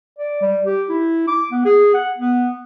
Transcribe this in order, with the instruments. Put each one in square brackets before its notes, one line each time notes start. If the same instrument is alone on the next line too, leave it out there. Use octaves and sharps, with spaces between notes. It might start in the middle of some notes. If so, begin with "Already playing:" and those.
[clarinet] D5
G3
G4
E4
D6
B3
G#4
F#5
B3